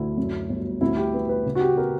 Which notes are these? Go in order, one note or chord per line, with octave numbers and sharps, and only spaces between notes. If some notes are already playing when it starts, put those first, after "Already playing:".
Already playing: D2 D3 E4
F#2
G1
D2 E4
G4
B3
B4
C#3
F#4
G4
B3 A#4